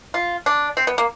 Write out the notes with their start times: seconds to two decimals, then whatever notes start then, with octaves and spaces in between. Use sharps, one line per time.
0.14 F4
0.46 D4
0.77 C4
0.87 B3
0.98 A#3